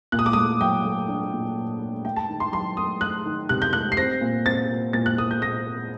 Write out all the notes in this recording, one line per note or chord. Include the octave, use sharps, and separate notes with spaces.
A#2 F#6
D#6
D6
A3 D#6
F#3 G5
A3
D4
A#2
A#2
A3
A3 G5
A5
D#3
C6
F#3 C6
A3 D#6
A3 F#6
D#3
C3 F#6
G6
A3 F#6
C7
C4 A#6
A#2
C4 A6
A#2
A#2 A6
F#6
A#2 D#6
G6
A#2 A#6
C4